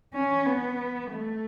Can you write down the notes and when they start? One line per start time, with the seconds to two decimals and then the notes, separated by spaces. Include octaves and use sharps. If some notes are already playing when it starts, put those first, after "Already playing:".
0.14 C#4
0.46 B3
1.10 A3